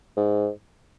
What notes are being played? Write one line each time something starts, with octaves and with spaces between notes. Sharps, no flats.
G#2